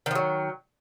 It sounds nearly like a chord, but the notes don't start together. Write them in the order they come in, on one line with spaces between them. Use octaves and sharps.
D#3 F3 F#3